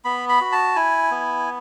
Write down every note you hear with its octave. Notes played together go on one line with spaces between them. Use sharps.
B3 B5
B5
F#4
A5
E4 G#5
B3